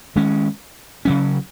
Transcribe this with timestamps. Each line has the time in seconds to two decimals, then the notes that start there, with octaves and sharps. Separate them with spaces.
0.16 D#3 G#3 C#4
1.05 C#3 F#3 C#4